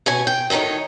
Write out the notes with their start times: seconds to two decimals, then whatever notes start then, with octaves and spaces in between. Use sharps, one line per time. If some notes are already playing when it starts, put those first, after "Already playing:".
0.06 B2 C#4 G#5
0.27 G5
0.50 D2 A2 D#3 D#4 C#5